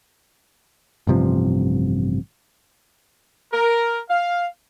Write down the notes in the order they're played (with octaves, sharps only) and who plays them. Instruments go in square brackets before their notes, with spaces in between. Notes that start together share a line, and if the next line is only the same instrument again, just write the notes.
[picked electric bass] A1 G2 C3 F3
[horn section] A#4
F5